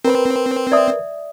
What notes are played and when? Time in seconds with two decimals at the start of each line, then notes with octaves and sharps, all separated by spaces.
0.04 C4 A#4 B4
0.72 D5 E5 D#6